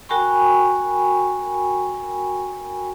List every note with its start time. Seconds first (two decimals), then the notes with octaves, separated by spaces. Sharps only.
0.09 F#4 A#4 G5 G#5 B5 C#6